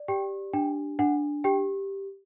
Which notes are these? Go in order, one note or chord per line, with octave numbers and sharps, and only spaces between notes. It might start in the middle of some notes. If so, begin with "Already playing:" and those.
Already playing: D5
G4 G5
D4 G5
D4 F#5
G4 G5